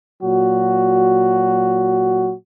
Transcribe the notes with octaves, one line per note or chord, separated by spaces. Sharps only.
A#2 F#3 F#4